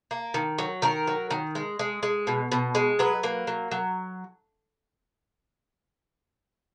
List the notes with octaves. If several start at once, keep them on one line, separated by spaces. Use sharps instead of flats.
A#3
D#3
F#3
D#3 A#4
F#3
D#3
G#3
G#3
G#3
B2
B2
G#3
F#3 B4
A#3
F#3
F#3